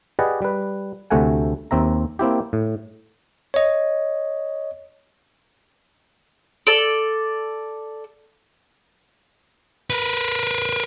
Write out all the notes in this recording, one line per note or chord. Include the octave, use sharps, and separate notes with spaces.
G4 G#4 B4 D5 D#5 F#5
G3 B4
D2 C3 A3 A4 F#5 G#5
D#2 C4 E5 A#5
A#3 C4 E4 G4
A2
C#5 D#5
A4 D5
A#4 B4